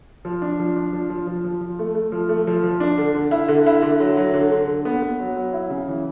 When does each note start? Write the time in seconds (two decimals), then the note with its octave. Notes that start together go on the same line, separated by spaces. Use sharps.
0.25 F3
0.42 D4
0.60 F3
0.76 D4
0.93 F3
1.10 F3
1.27 F3
1.44 F3
1.61 F3
1.79 A3
1.95 A3
2.12 F3
2.29 A3
2.47 F3
2.64 F3
2.80 D4
2.98 D3
3.15 D3
3.31 E4
3.48 D3
3.66 E4
3.82 D3
4.00 F#3
4.17 F#3
4.34 D3
4.51 D3
4.68 D3
4.85 B3
5.02 B3
5.20 F#3
5.37 F#3
5.53 E4
5.70 C#3
5.88 E3